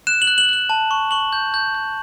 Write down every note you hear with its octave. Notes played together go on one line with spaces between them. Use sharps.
F#6 E7
F#7
F#6
F#7
F#6 F#7
A5
C#6
C#6 F#7
G6
G6
G6